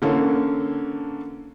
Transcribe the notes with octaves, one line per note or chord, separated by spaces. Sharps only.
D3 E3 A#3 C#4 A4